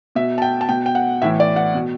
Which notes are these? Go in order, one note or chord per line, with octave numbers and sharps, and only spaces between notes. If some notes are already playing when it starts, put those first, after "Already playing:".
B2 E5
A5
G5
A5
B2 G5
G5
F#5
A2 E3 E5
D5
F#5
B2